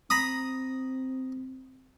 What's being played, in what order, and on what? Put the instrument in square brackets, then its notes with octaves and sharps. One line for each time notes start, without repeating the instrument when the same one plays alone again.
[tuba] C4 [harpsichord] A#5 B5 D#6